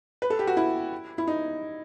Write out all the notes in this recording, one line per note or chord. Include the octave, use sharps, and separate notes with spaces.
B4
A4
G4
F#4
E4
E4
D#4